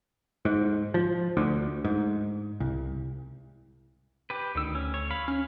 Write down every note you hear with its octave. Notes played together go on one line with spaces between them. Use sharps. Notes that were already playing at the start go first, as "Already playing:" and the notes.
G#2
F3
D2
G#2
C2
G4 B4
D2 D#3 E6
C#4
C#5
F5 B5
C#4 F6